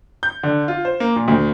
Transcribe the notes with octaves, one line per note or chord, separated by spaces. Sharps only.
G6
D3
F4
C5
A#3
A#2
D2